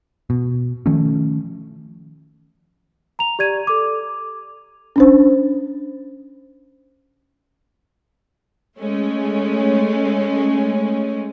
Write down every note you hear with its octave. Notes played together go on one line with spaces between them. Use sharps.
B2
D#3 F3 A3 C#4
A#5 F7
G4 D5 G#6 D#7
A4 D6
C#4 D4 C5
G#3 A3 C#4